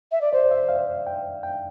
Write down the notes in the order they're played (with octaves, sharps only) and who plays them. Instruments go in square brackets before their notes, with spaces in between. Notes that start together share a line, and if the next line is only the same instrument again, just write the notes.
[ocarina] E5
D5
[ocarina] C5 [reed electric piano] D5
[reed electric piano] E5
F5
G5
G5